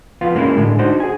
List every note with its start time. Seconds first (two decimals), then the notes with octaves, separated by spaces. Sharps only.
0.21 F2 B3 F4 F5
0.35 G#3 A#3 C#4 D4 E4 F#4
0.57 A2 D3 G#3
0.79 D4 D#4 F#4 C5
1.00 G#4 G#5